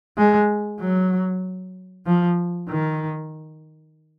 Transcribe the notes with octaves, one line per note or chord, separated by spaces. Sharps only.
G#3
F#3
F3
D#3